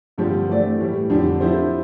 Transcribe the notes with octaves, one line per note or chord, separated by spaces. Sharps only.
G2 D3 F3 C4 G4
E3 A3 C4 G4 D5
A2 E3 G3
F2 D3 G3 D4 G4
F3 C4 E4 G4 C5